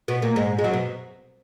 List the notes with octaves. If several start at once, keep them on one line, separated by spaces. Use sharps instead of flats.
B2 B3
A#2 A#3
G#2 G#3
G#3
F#2 F#3
B2